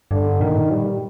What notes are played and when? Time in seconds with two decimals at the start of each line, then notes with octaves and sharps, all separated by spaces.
0.11 G2 D3
0.41 A#2 D#3
0.50 A2
0.59 A#2
0.71 G3